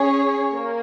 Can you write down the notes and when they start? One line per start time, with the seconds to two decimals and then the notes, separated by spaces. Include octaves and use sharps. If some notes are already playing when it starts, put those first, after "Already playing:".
Already playing: C#4 G#4 C#5
0.52 A#3